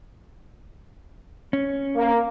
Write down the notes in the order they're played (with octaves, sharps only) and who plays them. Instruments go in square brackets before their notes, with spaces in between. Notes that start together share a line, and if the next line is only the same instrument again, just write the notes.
[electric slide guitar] C#4
[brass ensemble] A#3